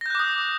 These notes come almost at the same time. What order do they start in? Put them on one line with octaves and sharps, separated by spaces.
A#6 G6 F#6 D6 D#6